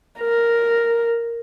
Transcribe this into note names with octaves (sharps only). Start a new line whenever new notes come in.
A#4